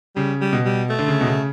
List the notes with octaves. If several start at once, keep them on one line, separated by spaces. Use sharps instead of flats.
C#3 G3
G3
B2
G3
A3
D3
C#3
B2
C#3